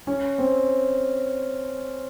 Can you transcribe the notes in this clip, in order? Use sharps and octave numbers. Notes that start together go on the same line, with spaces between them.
C#4
C4